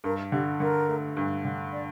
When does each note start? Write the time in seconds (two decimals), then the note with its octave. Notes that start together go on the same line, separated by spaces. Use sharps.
0.04 G2 A#4
0.32 D3 G4
0.60 D3 A#4
0.88 A3
1.17 G2
1.45 D3
1.72 D5